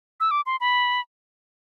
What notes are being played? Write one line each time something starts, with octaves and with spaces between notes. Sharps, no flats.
E6
D6
C6
B5